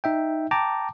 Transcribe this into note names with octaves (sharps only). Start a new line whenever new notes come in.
D#4 E5 G5
G5 A5 A#5 D6